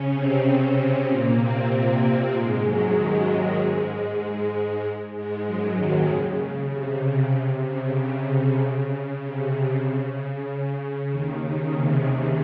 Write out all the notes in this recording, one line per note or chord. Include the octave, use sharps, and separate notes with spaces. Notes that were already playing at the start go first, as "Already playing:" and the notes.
Already playing: C#3 C#4
C3 C4
A#2 A#3
C3 C4
A#2 A#3
G#2 G#3
F#2 F#3
D#2 D#3
F#2 F#3
G#2 G#3
G#2 G#3
F#2 F#3
D#2 D#3
C#3
C#3
C3
C#3
C3
C#3
C3
C#3
C#3
C#3
C3
C#3
D#2 D#3
C#3
C3
C#3